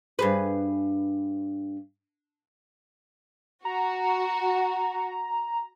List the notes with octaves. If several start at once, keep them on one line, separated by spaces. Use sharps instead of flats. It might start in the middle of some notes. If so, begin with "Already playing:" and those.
G2 G#4 B4
F#4 A#5